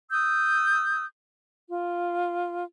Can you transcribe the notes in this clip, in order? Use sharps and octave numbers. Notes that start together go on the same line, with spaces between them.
D#6 E6 G6
F4